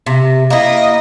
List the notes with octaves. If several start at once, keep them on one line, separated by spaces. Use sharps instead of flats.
C3
A#3 E4 D#5